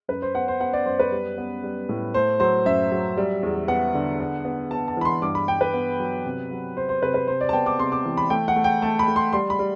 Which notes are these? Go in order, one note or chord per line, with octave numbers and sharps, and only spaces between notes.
F#2 B4
C5
B3 F#5
C5
B3 F#5
D5
F#2 C5
B4
G3
B3
G3
A2
A3 C5
F#3 C5
F#2 E5
F#3
G3
E2
B3 F#5
D3
B3
B3
B3 A5
A5
E3 B5
C6
G2 D6
B5
G2 G5
B4
B3
F#3
C3
F#3
C3 C5
C5
C3 B4
B4
C3 C5
D5
A5
B3 G5
D6
C3 C6
D6
E3
B5
A3 G5
F#5
A3
G5
A3 A5
B5
A3
C6
G3 C6
B5
G3